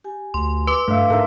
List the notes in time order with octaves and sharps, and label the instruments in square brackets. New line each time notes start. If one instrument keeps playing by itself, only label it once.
[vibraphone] G4 G#5
[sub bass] D2 [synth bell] C6
[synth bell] B4 C6 D6
[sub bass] G2 [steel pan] A3 E5 [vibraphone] D4 F5
[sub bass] G#2 [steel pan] A4 A#4 E5